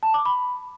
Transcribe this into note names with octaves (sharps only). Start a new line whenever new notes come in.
A5
D6
B5